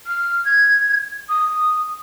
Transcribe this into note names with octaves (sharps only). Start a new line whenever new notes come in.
F6
G#6
D#6